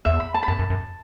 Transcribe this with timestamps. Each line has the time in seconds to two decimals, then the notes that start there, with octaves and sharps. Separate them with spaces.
0.05 E2 E5
0.20 B5
0.34 A5
0.43 B5
0.48 F#2 A5
0.59 F#2
0.70 F#2